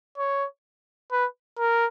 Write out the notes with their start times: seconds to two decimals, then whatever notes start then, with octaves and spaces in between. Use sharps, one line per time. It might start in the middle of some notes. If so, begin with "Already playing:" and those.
0.18 C#5
1.12 B4
1.58 A#4